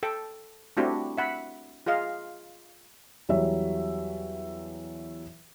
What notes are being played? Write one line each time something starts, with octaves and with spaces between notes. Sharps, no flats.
A4 G5
A3 C4 D4 E4 F#4 G4
E5 F#5 B5
F4 G#4 D#5 F5
E2 F#3 G3 C#5 E5